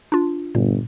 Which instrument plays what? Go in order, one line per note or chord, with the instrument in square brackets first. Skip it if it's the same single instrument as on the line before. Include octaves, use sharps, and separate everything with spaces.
[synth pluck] D4 F4
[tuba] G1 [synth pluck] A#2